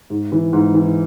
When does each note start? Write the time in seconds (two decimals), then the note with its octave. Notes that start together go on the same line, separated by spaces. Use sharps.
0.10 G#2
0.32 E3
0.53 G#2
0.74 E3